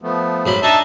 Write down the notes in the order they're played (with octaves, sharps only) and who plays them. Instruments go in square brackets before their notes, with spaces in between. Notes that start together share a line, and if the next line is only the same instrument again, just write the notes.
[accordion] F3 A3 B3
[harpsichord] G#2 F#3 B5
[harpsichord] D4 [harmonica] D#4 E5 A5